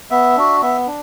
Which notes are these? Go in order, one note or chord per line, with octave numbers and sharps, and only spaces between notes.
B3 E5
D4 F#4
B3 E5
D4